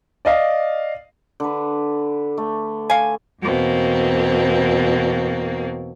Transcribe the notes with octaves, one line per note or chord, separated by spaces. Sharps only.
D5 D#5 F5
D3 B4
A3
F5 G#5
E2 B2 A#3 C4